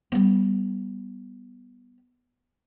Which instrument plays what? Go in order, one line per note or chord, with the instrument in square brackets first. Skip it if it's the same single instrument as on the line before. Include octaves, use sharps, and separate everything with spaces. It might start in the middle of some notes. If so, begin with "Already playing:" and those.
[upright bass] G3 B3